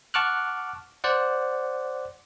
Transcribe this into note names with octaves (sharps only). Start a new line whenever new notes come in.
F#5 A5 C#6 D6 F6 F#6
C5 D5 F#5